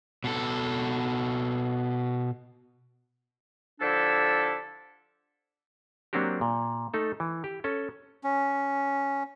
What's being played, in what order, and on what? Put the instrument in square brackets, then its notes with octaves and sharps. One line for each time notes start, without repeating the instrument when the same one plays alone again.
[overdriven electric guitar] B2 A4
[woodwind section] D3 F3 D4 E4 G4 A4
[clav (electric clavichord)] F#3 A#3 C4 D4 F#4 G4
A#2
A3 D#4 A4
E3
G4
C#4 A4
[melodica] C#4